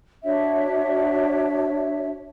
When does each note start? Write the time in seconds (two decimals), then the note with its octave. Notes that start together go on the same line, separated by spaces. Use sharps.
0.24 D4 F#4 C#5 E5